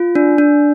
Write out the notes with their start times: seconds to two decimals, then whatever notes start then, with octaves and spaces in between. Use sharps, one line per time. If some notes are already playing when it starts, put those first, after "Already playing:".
Already playing: F4
0.15 D4
0.38 D4